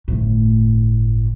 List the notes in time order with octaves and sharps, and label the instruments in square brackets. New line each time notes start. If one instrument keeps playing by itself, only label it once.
[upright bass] G1 A2